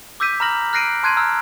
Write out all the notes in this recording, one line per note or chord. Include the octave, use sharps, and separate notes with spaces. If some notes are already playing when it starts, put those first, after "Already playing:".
D6 E6 G6 B6 D#7
A#5 B5 F6 A#6 F#7
F6 F#6 A#6 C7 D7 D#7
A5 C6 F#6 G#6 C7 D#7
A#5 E6 F6